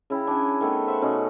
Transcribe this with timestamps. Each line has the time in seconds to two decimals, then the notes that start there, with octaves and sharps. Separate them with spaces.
0.10 C#3 E4 G5
0.27 D4 G#4 G#5
0.60 D#3 A3 B3
0.88 C5 E5 F#5
1.02 B2 C#4 D#4